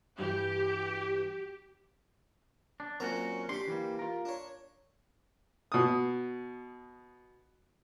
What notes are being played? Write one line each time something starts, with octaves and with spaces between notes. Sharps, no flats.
G2 E3 G4
D4
A#2 F#3 C4 C#4 F#4 A#5
D4 G4 B5 C6
E3 G3 A#3
F4 A#4
D4 C#5
B2 D#6